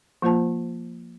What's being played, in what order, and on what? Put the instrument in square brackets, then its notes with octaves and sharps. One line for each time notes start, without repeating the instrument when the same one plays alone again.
[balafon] F3 A#3 F4 C5 A5